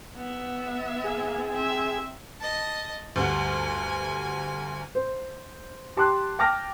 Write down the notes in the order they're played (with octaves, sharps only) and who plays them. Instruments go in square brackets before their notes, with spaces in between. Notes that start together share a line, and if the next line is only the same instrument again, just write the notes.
[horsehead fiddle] B3 E5
[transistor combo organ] G#4
[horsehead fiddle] C4 E5
[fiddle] D#5 A5
[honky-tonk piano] D2 G2 F#5 [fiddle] G#5
[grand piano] C5
G4 A5 C6 D6 F#6
G5 A5 D6 F6 A#6